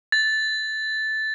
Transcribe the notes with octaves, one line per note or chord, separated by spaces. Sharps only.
A6